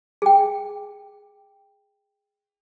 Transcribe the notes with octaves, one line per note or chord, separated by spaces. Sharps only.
G#4 G5